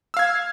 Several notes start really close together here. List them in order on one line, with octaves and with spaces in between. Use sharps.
E6 F5 G#6